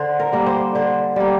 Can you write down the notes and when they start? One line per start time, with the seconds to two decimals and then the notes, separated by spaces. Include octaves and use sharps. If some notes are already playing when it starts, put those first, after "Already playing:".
Already playing: D3 C5
0.20 A#4
0.33 G3 A#3
0.46 C5
0.75 D3 C5
1.16 G3 A#3